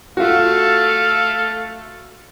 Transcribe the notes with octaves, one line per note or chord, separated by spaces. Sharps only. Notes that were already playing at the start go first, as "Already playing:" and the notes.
A3 F4 F#4 A4 F5